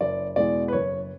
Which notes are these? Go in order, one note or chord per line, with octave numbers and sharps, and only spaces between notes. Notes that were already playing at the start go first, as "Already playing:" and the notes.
F#1 D5
E2 B2 G#3 D5
B4
F#1 C#5